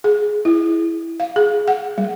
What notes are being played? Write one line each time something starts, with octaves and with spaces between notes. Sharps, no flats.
G#4
E4
F5
G#4
F#5
G3